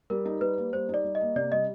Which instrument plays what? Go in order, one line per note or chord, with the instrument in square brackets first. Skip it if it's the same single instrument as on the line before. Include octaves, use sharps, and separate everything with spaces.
[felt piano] G3 [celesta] A#4
[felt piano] D#4
[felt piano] G3 [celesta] B4
[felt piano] A#3
[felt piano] G3 [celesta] C5
[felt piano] D#4
[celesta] D5
[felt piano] G3
[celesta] D#5
[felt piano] A#3
[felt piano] C3 [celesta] D5
[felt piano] G3 [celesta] D#5